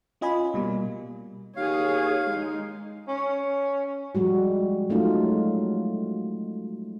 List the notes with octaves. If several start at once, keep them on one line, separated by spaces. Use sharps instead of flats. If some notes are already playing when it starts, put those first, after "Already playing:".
C#4 F4 D#5 G#5 B5
B2 G3 A#3
D#2 G#4 C#5 F5
G#3 D#4
C#4
F3 G3 G#3 F#4
F#3 G#3 A3 C#4 D#4 F4